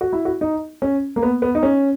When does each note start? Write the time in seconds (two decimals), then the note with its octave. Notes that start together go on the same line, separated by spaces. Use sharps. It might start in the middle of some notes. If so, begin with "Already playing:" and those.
0.01 F#4
0.13 E4
0.25 F#4
0.41 D#4
0.82 C#4
1.16 A#3
1.22 B3
1.42 B3
1.55 D#4
1.63 C#4